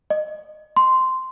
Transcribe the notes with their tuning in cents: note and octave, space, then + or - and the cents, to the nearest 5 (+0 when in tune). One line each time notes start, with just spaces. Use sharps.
D#5 -25
C6 -10